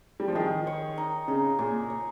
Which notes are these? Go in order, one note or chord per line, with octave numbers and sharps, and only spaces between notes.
G3
F3
D#3 G#4
C#5
D#4
C#3 D#4
A#2 G#4
C#5